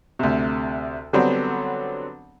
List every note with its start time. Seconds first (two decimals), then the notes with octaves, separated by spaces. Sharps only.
0.19 D2 C3
1.13 D3 F#3 G3 B3 C4 D4